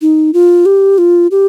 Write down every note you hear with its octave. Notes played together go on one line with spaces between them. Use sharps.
D#4
F4
G4
F4
G4